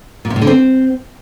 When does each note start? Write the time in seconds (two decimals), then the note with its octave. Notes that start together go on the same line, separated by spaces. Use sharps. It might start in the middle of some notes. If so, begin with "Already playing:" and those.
0.25 A#2
0.30 C3
0.36 A2
0.42 D3
0.47 C4